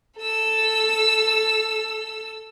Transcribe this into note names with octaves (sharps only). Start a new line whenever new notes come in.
A4 E6